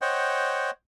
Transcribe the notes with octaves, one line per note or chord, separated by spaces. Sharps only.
C5 C#5 D#5 F#5 G5